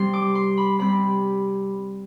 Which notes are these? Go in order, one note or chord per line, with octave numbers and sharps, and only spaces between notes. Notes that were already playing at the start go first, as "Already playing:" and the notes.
Already playing: C3 G3 C4 C6
D6
C6
B5
C3 G3 C4 B5